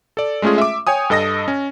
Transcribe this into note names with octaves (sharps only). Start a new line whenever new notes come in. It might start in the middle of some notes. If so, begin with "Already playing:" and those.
A4 D5
G#3 A3 C#4 F4 G#4
E5 D6
C#5 G5 G#5 D#6
G2 A4 D#5 D#6 A#6
C#4